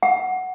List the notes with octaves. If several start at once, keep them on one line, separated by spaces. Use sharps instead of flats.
F#5